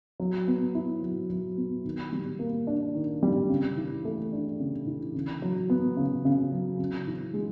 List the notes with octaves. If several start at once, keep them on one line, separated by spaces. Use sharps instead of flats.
F#3
B3
E4
F#3
F#3
B3
D#3
G3
A#3
D4
D#3
G3
C#3
E3
A3
D4
C#3
E3
C#3
F#3
B3
C#3
C#3
F#3
C#3
E3
G#3